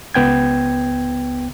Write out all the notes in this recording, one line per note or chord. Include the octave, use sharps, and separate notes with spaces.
C#2 B3 G5 G#6